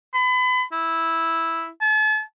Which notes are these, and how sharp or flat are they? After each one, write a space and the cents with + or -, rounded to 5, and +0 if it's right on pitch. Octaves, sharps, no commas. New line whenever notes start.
B5 +35
E4 -5
A5 -40